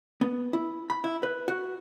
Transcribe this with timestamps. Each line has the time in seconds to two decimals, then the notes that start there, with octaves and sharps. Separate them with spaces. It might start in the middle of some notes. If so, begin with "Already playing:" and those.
0.21 B3
0.53 E4
0.90 B5
1.04 E4
1.23 B4
1.48 F#4